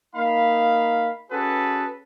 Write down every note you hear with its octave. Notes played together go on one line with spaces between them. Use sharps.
A#3 D#4 F5 B5
C#4 F#4 G#4 A4 B4